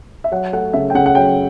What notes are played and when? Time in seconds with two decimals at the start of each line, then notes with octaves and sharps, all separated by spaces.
0.24 E5
0.32 F#3 F#5
0.53 A3 F#5
0.73 C#3 E5
0.90 G5
0.95 C#3 F#5
1.06 F#5
1.15 F#3 G5